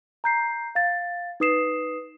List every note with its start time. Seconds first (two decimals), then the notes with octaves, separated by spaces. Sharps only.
0.24 A#5 G6 C7
0.75 F5 A6
1.40 D#4 B4 D#6 C7 E7